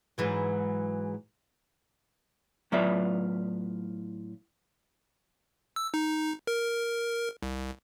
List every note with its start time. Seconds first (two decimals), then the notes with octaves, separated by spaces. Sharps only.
0.18 G#2 E3 F#3
2.72 A2 F#3 B3 F4 D5 E5
5.76 E6
5.94 D#4
6.47 A#4
7.43 C2